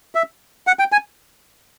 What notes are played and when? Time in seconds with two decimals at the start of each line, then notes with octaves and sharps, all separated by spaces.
0.15 E5
0.67 F#5
0.79 G5
0.92 G#5